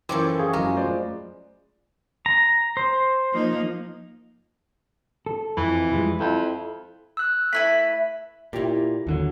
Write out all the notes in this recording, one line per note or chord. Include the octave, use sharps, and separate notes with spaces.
F#2 E3 F3 A4 G5 C6 D6
G#4 F5 C#6
F#2 G#3 A#4
A3 F4 C5 D5
A#5
C5
F3 A#3 D#4
A4
F2 E3
F3 G3 G#3
F2 E4
E6 F#6
A3 E4 B4 B6
A#2 E4 G4
D#2 D3 F#3